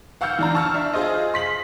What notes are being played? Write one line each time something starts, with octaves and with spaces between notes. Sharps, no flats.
F5 F#5 E6 F6 G6 C#7
E3 D4 A#5
A5 C#6 E6 F6
D4 E5
F4 G#4 C5 D#5
C6 B6 F#7